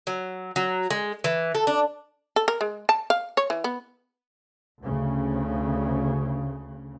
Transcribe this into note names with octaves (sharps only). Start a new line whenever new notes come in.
F#3
F#3
G#3
E3
A4
D4
A4
A#4
G#3
A5
F5
C#5
E3
B3
D2 C#3